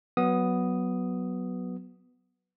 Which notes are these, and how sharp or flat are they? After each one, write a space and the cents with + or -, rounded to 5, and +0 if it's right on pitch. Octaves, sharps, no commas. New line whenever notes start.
F#3 +0 B3 +0 D#6 +0